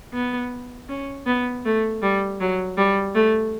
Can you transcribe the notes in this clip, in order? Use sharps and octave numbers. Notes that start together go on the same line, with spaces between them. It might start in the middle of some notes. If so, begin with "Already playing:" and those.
B3
C#4
B3
A3
G3
F#3
G3
A3